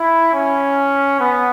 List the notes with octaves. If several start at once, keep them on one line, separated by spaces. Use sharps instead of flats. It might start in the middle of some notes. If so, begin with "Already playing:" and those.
Already playing: E4
C#4
B3